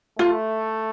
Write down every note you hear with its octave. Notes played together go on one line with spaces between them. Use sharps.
A3 F4